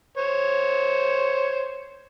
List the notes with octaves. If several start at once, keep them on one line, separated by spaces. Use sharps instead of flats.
C5 C#5